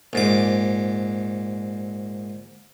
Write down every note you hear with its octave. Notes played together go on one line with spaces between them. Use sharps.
A#1 G#2 D6